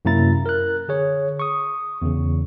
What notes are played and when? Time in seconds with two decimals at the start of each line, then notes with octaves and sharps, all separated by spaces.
0.05 F#2 C3 A#3 E4 A#5 A6
0.46 A#4 F#6
0.88 D3 G#4 C#5
1.40 C#6 D#6
2.02 E2 C#3